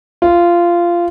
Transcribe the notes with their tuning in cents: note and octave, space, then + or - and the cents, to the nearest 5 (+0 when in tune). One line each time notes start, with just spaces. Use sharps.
F4 -15